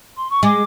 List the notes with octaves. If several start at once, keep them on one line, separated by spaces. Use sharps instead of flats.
C6
C#6
G#3 D6